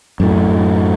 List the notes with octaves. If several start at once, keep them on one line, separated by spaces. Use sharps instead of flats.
F#2 A2